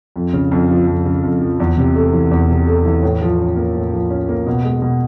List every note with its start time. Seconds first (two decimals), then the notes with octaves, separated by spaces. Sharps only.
0.16 F2
0.33 C#3
0.52 F2
0.70 F3
0.87 F2
1.06 C#3
1.23 F2
1.42 F3
1.60 E2
1.77 C3
1.95 A3
2.13 E3
2.31 E2
2.50 C3
2.67 A3
2.85 E3
3.03 A2
3.22 F3
3.39 C#4
3.56 A#3
3.75 A2
3.93 F3
4.10 C#4
4.29 A#3
4.46 B2
4.65 G#3
4.82 B2